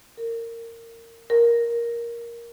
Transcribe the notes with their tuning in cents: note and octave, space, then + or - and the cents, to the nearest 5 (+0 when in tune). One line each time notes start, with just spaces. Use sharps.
A#4 -25
A#4 +10